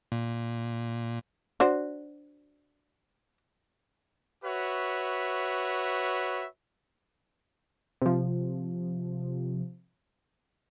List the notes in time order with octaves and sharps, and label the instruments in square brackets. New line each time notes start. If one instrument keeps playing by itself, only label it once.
[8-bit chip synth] A#2
[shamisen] D4 F#4 C5
[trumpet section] F#4 B4 C#5 E5
[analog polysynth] C3 F3